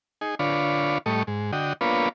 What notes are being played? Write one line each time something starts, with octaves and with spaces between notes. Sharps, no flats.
D#4 G#4
D3 D4 F4 B4 C#5
A2 G3 A3 D#5 C#6
G#2
D3 F#4 D#5 G5
A#3 B3 D4 F4 B4 C#5